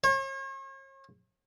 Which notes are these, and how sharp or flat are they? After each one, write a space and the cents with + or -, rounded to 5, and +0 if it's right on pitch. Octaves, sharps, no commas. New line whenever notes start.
C#5 -45